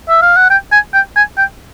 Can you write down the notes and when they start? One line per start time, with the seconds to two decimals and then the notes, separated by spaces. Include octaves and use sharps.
0.09 E5
0.22 F5
0.36 F#5
0.50 G5
0.72 G#5
0.93 G5
1.16 G#5
1.37 G5